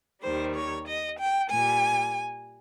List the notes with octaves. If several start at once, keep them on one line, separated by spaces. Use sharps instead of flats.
D#2 D#3 G3 C5
C#5
D#5
G5
A#2 G3 G#5